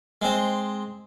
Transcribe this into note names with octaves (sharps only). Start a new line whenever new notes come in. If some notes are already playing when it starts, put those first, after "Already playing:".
G#3 C4